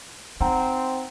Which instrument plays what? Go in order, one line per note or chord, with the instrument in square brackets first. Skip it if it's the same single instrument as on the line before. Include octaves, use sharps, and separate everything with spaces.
[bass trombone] C4 [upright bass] D#4 [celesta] F#5 G5 A#5